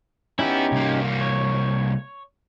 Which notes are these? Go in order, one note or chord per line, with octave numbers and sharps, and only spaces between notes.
B3 C#4 D#4 E4 G4
C2 A#3
C#5